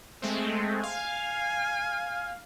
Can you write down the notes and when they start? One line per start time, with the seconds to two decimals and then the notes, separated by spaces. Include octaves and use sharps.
0.22 G#3 A3 C4
0.83 F5 G#5